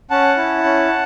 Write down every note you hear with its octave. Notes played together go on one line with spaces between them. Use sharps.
C#4 F#5 A5
E4
C#4